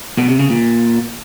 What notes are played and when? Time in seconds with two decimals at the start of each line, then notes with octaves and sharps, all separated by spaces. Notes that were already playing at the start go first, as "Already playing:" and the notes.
0.18 B2
0.29 C3
0.39 C#3
0.50 A#2